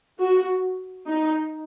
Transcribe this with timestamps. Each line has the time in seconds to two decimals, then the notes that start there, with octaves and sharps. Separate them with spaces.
0.20 F#4
1.08 D#4